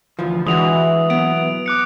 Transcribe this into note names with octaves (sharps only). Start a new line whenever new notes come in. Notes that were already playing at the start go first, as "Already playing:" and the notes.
D2 E3 F3
E3 G#3 D4 F#4 D#6 F7
F#3 B3 D7
D6 F#6 C#7